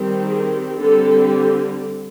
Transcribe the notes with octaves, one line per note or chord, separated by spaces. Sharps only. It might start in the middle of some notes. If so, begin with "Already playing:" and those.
Already playing: D#3 G3 C4
G#4
D3 G3 C4 A4